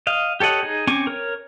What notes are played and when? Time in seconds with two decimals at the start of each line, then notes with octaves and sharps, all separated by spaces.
0.07 D#5 F5
0.40 G4 A4 C#5 D#5 F#5
0.63 D#4 G#4
0.87 C4 C#4 G#5 C#6 D6
1.07 A#4 C#5